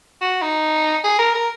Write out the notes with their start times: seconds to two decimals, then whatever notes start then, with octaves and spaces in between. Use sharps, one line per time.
0.21 F#4
0.42 D#4
1.04 G#4
1.19 A#4
1.34 A#4